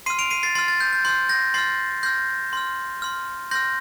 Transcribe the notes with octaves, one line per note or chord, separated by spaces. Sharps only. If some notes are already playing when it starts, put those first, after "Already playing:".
C6 F6 C7 D#7
D7 F7
C7 D#7
A6 C7
C6 F6 A6 C7
A6
G6
G6
C6 F6 G6
G6 A#6
C6 F6 A6 C7
C6 F6 G6 A#6
C6 F6
C6 F6
C6 F6 G6 A#6